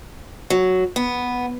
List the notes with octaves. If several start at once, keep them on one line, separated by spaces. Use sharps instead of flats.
F#3
B3